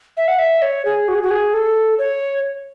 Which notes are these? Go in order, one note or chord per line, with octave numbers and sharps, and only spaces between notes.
E5
F#5
E5
C#5
G#4
F#4
G#4
F#4
G#4
A4
C#5